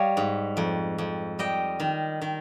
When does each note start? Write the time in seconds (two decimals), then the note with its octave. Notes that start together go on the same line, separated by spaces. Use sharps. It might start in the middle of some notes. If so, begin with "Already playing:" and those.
Already playing: G3 C#5 D#5 F5
0.17 G#2
0.57 F2
0.98 F2
1.39 G3 D#5 G5
1.80 D#3
2.21 D#3